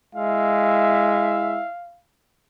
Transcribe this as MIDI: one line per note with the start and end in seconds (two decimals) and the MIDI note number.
0.15 1.62 56
0.15 1.67 64
0.15 1.67 76
0.15 2.01 77